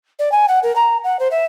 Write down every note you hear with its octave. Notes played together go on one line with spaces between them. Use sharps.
D5
G#5
F#5
A#4
A#5
F#5
C5
E5